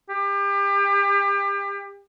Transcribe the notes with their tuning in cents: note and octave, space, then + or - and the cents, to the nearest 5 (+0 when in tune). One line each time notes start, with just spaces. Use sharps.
G4 +30